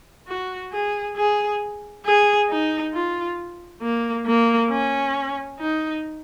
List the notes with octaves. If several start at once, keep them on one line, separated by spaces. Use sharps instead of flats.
F#4
G#4
G#4
G#4
D#4
F4
A#3
A#3
C#4
D#4